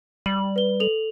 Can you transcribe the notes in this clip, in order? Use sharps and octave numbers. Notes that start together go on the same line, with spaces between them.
G3 F#7
B4 G7
A4 F7 F#7